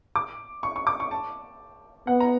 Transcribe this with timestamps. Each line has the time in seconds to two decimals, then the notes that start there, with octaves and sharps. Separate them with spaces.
0.16 D6
0.63 C#6
0.76 C#6
0.87 D6
1.00 C#6
1.11 A5
2.07 B3 F#5
2.20 A#5